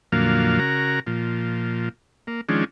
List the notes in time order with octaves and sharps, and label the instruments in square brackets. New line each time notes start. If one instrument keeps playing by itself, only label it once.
[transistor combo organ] F2 A#2 D3 F#3 A#3 F5
C#3 F#4 A#4 A#5
A#2 F3
A#3
D#3 F3 G#3 C#4 D4